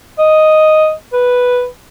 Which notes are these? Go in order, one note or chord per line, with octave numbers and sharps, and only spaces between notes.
D#5
B4